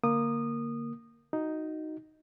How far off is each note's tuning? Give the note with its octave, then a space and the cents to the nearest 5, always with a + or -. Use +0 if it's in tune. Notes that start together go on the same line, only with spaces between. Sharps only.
D3 -10 A#3 +0 D#6 -20
D#4 +0 F#4 +0